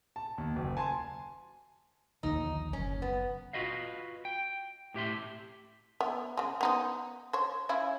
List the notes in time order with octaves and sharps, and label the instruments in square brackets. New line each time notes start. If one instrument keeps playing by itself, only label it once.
[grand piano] A5
D#2
F#1
G#5 A5 C6
[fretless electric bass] A#1 D#2 D3 [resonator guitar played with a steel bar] D#4
[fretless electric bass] F#1 [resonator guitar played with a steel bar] C#4
[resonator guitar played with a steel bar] B3
[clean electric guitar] F4 F#4 B4 D#5 F5
G5
A2 G4 E5 C6
[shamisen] B3 E5
C#3 G#3
B3 D#4 C5
C5 C#5
C#4 E4 F4